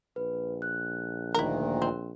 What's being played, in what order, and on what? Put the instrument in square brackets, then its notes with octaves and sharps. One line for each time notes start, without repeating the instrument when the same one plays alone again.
[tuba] A#1 [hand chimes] B4
[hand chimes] F#6
[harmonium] D2 A#2 D#3 [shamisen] E4 A#4
[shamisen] C4